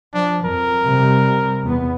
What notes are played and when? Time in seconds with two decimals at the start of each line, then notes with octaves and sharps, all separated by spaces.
0.14 F3 D4
0.45 F2 A#4
0.83 C3 G3
1.63 E2 B3